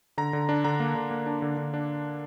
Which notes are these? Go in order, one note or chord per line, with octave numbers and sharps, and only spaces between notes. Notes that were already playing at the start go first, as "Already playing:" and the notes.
D3 A#5
D3
D4
D3 A#5
A#3
D3
A#3
D4
D3
D3
D4